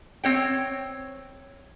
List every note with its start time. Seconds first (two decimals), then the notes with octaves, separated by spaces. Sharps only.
0.24 C4 C#5 G5